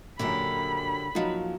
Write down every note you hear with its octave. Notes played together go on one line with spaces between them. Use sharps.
A#1 F#2 D3 G4 A#4 B5
A#2 F3 F#3 D#4 F#4